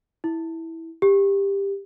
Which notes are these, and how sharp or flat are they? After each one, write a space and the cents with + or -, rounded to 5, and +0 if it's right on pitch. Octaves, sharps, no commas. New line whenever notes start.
E4 -10
G4 +15